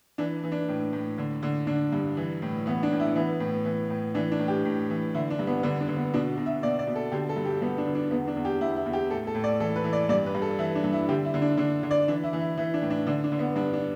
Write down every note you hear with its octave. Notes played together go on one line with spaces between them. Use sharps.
E3 D4
E3
D4
A2
A2
D3
D3
D3 D4
G2
E3
A2
E3 B3
D4
A2
E4
E3 B3
A2
E3
A2
E3 D4
D4
A2
G4
A2
E3
D3 E4
D4
G2
B3
D3 B3
D4
D3
B3
B2 D4
B2
E5
B2 D5
D5
B2
A4
D3 G4
A4
G2
G4
G2 B3
D4
D3
D4
E2 B3
D4
E2
G4
E2 E4
E4
E2
G4
A2 A4
A4
A2
D5
E3 A4
B4
E3
D5
G2 D5
B4
G2
A4
E3 E4
D4
G2
E4
D3 G4
E4
D3
D4
D3 D4
D3
D5
E3 D4
E4
E3
E4
E3 E4
D4
A2
D4
D3 D4
D4
D3
B3
G2 D4
D4